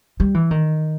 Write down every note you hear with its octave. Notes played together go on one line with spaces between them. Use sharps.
G3
E3
D#3